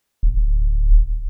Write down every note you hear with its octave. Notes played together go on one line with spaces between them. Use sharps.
D1